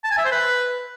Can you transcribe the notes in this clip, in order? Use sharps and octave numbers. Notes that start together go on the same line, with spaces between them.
A5
G#5
E5
C5
B4